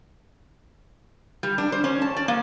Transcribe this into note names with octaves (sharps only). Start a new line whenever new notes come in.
G3
D4
C5
C#4
A5
D5
A#3